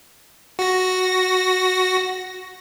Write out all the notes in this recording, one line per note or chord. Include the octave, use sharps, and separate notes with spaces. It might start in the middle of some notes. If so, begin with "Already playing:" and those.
F#4 A#6